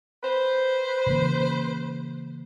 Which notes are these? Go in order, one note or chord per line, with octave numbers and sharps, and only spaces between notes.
B4 C5
C#3 E3 A#3